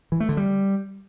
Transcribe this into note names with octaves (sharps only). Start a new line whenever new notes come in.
E3
A3
D3
G3